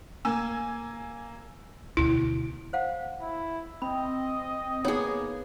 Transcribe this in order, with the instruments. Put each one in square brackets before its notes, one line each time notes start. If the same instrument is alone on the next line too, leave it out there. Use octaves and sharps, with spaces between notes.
[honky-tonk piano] A#3 G#5 E6
[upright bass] D2 B2 [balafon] E4 [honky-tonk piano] D7
[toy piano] C5 F5 F#5
[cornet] E4
[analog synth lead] C4 [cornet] D#5 [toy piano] B5
[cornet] A#3 [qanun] B3 G#4 [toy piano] D#4 C#5